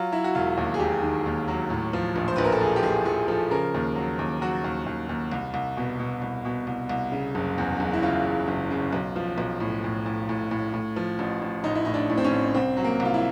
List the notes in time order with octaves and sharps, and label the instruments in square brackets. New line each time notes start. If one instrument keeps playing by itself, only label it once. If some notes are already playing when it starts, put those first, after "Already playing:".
Already playing: [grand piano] F#3 F4
F#3 E4
F#4
E1 F4
D#2
G#4
E1 G4
D#3
D#2
F#3
A2
F3
A#1
C5
A#1 B4
A#4
A4
F3 G#4
G4
A#1 G#4
A#1 G#4
F3 A4
C#3 A#4
D#2
F#3
D#2
F#3 F#4
D#2
D#2
D#2
C2
C2
B2
B2
C2
B2
C2
C2
C#3
F#1
E2
F#1
E4
C#3 F4
E2
F#1
C#3
B1
F3
B1
A2
A2
A2
A2
A2
A2
F3
A1
A1
A1 D#4
E4
A2 D#4
D4
A2
C4
C#4
A1
C2 C4
F#3
A#3
C2
F4
E4